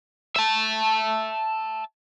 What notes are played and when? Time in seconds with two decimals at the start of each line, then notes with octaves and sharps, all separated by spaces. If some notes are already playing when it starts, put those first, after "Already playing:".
0.36 E5 A5